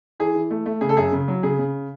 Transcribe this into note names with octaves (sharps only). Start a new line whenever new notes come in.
E3 G#4
E3
A3
A3
C#3 G#4
A4
F#2 G#4
C#3
F#3
C#3 G#4
C#3